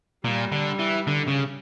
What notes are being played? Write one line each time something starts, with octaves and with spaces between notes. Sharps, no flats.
A#2 G3
D3
E3
D3
C#3